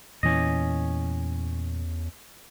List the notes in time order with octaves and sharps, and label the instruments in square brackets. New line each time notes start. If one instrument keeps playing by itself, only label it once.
[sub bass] E2 [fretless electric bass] A#2 E3 [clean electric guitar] C#4 D#5